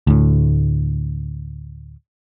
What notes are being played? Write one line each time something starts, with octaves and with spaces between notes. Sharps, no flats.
D2 A2